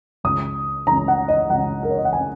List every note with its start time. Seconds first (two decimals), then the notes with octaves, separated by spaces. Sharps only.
0.24 C#2 C#3 D#6
0.87 C#2 C#3 A#5
1.08 F#5
1.28 D#5
1.50 C#2 C#3 F#5
1.83 A#4
1.90 C#5
1.98 D#5
2.05 F#5
2.13 C#3 G#5